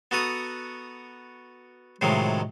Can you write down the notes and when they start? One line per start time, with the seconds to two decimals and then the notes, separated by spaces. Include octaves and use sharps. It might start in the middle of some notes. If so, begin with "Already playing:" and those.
0.11 B3 F#4 A4 A#5 D#6
2.01 A2 C3 D#3 F3 F#3 G#3